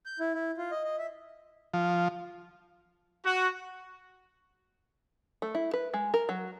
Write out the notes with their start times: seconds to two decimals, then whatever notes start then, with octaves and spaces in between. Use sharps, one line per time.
0.06 G6
0.20 E4
0.34 E4
0.58 F4
0.71 D#5
0.84 D#5
0.98 E5
1.74 F3
3.25 F#4
5.42 A3
5.55 E4
5.74 B4
5.94 G#3
6.14 A#4
6.29 F#3